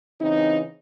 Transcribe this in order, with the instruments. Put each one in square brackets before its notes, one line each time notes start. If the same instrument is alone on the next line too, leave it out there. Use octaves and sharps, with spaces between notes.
[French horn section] C#3 E3 C4 D#4